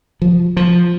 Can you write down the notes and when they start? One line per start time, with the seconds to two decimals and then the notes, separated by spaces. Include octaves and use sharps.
0.22 F3
0.57 F3